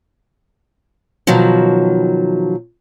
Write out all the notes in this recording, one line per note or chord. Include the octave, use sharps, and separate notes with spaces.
B2 D#3 F3 F#3